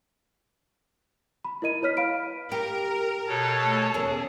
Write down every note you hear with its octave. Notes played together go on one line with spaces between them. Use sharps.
B5
E4 A#4 D#5 D#7
E4 B4 C#5 F6 B6
F5 B5 D7
G4 A#4
B2 A4 C#5 A5
A3
E2 C#4 G#4 A#4